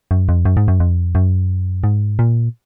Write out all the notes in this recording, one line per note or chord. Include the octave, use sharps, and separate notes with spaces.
F#2
F2
F#2
G#2
F#2
F2
F#2
G#2
A#2